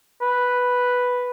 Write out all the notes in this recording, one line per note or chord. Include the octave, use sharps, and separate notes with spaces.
B4